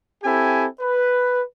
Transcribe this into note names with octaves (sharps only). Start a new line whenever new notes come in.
C4 E4 G4 A4 G#5
B4